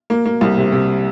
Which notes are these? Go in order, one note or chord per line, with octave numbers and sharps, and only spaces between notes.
A#3
A#3
C2
C3
C3